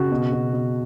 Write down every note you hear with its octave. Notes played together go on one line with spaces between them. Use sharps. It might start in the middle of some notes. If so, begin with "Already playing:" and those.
Already playing: C#3 F#4
B2
B2
B2